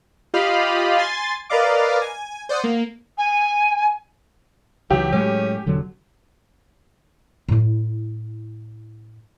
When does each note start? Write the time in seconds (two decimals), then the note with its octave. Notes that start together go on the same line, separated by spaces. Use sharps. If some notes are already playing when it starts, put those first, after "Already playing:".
0.34 F4 G4 D#5 F5 B5
0.97 G#5 C6 A6
1.50 A#4 B4 D5 D#5 F5 D6
2.01 G#5
2.49 C5 D5 F#5 D#6
2.64 A#3
3.18 G#5
4.90 C#2 E3 F#3 G4
5.13 A2 F#3 G#3 C#4
5.66 E1 D3 F#3
7.48 A2 E4